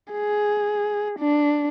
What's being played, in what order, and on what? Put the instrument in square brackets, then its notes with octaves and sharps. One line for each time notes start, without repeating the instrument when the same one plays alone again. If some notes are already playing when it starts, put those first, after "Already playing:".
[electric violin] G#4
D4